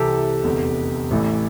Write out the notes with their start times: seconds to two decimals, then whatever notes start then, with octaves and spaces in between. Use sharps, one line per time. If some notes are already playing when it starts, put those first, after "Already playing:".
Already playing: C2 C3 E3 G4 A4
0.44 F1 E2 D3
1.11 A1 A2 E3